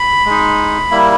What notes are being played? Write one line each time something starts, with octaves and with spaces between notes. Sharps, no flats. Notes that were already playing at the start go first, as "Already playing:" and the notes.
Already playing: B5
G#3 D#4
G3 A#3 E4